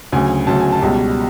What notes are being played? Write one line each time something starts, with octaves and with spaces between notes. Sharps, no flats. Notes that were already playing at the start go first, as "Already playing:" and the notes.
D2 C#3 F#3 G#5
D2 C#3 F#3 A5
G#5
A5
C#2 B2 G3